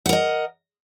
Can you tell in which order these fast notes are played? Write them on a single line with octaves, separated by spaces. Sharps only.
F#5 A#4 D#5